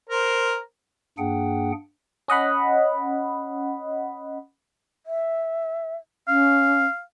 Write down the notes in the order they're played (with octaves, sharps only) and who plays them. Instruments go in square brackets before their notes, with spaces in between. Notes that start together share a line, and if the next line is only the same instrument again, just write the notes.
[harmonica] A#4 C5
[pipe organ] G2 A#3 D4 G#4 F#5 G5
[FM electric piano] C#4 D#5 F#5 B5
[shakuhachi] E5
[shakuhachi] C#4 [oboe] F5